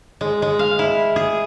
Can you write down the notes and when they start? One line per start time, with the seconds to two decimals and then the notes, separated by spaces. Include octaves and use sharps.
0.21 G#3
0.42 G#3
0.59 F5
0.79 E4
1.16 G#4